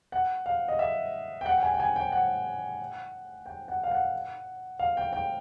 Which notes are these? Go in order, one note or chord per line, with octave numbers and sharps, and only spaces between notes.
F#5
F5
D#5
E5
G5
F#5
G5
G#5
G5
G#5
G5
F#5
G5
F#5
F5
F#5
F5
G5
G5